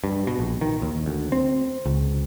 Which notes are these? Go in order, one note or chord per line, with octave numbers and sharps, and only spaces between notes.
G2
B2
A#1
D#3
D#2
D2
C4
C#2